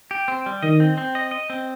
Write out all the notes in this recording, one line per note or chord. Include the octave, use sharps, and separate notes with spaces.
G4
C4
G3
D#3 D#5
C4
C4
D#5
D#5
C4